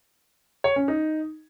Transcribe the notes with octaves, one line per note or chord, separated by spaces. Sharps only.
C#5
C#4
D#4